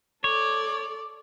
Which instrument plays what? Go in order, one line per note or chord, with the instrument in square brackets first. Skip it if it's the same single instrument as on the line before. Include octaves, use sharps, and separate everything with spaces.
[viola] A4 D5 [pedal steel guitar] C#5